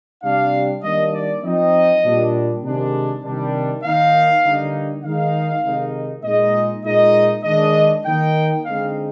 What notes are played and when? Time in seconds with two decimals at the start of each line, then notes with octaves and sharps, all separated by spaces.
0.23 C3 G3 D4 F5
0.82 D#3 G3 A#3 D4 D#5
1.13 D5
1.43 F3 C4 D#4 D#5
2.04 A#2 G3 D4
2.63 C3 D#3 G#3 D4
3.23 C3 D#3 G3 D4
3.83 D#3 A#3 D#4 F5
4.44 D3 G3 A#3 D#4
5.04 D#3 G#3 D#4 F5
5.64 C3 D#3 G#3 D#4
6.24 A#2 G#3 D#4 D#5
6.84 A#2 G#3 D#4 D#5
7.44 D#3 G#3 D4 D#5
8.05 D#3 A#3 D#4 G5
8.64 D3 G#3 C4 D#4 F5